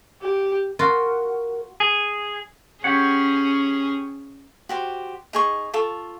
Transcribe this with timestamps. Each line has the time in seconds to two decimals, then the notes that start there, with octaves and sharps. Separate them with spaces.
0.22 G4
0.79 F4 F#4 A#4
1.80 G#4
2.84 C#4 G4 G#4 C#5 F#5
4.69 F#4 G4 C5
5.33 D#4 G#4 C#6
5.74 F4 A4 C#6